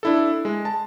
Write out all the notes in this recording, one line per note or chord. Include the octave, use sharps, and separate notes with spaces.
D4 E4 A4
G#3
A5